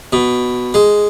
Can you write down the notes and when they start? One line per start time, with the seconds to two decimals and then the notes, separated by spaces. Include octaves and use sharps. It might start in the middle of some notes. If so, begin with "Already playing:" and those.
0.13 B2
0.74 G#3